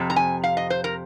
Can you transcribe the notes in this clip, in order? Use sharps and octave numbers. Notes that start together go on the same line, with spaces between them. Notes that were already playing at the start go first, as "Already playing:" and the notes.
Already playing: F2 C3
A#5
G#5
F5
D#5
C5
A#4